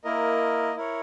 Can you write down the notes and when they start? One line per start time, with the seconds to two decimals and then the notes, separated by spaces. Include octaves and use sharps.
0.04 A#3 E4 A#4 D#5
0.76 E4 A#4 C#5